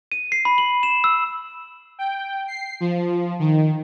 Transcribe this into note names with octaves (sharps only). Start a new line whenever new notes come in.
D#7
C7
B5
F#7
E7
E6
G5
C7
F3
D#3